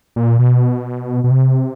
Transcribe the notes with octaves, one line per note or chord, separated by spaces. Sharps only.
A#2
B2
B2
C3